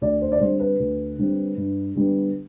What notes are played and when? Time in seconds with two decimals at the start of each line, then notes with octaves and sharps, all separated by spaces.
0.01 D2 D5
0.21 C5
0.32 D5
0.40 D3 G3 C4 C5
0.60 B4
0.80 D2
1.18 D3 G3 C4
1.57 G2
1.95 D3 G3 B3